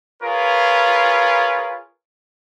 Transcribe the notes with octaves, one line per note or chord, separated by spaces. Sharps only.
F4 G#4 A#4 B4 C#5